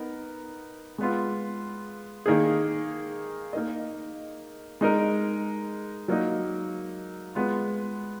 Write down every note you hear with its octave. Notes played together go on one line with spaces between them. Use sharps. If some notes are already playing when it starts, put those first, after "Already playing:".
Already playing: B3 D#4 A#4
G#3 B3 F4
D#3 A#3 D#4 G#4
A#3 D#4 A#4 D#5
G#3 D#4 A#4
F#3 A#3 D#4
G#3 B3 F4